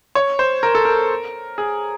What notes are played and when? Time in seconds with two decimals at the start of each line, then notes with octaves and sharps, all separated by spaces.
0.15 C#5
0.39 C5
0.63 A#4
0.75 A4
0.85 A#4
1.58 G#4